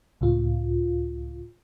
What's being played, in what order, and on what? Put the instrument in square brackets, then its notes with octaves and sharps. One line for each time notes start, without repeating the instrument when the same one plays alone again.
[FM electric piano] C#2 A2 F4